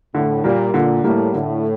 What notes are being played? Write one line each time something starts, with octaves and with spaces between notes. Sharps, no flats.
A2 D3
A#2 G3 A#3
A#2 D3
A2 G3 A#3
A2 D3